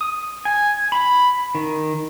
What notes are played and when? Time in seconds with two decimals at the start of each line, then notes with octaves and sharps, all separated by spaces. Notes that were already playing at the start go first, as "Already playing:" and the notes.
0.01 D#6
0.45 G#5
0.92 B5
1.55 D#3